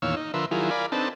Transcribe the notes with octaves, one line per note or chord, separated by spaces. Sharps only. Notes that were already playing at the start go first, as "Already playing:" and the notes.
E2 A#2 D#3 C#5 F5 E6
D#4
D3 F3 A#4 B4 E5 C6
D#3 F#3 E4 F4 G#4 A#4
A#4 D5 F5 G#5 B5
C4 D4 D#4 A4 B4 A5